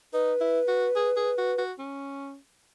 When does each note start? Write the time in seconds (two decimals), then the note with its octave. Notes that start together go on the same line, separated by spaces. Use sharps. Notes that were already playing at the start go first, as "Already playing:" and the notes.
0.13 D#4 B4
0.41 E4
0.68 F#4
0.96 G#4
1.16 G#4
1.38 F#4
1.58 F#4
1.79 C#4